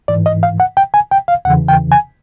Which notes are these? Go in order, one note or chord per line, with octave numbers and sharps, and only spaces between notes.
G#2 E3 D5
D#5
F5
F#5
G5
G#5
G5
F5
E2 C#3 E3 F#5
G5
G#5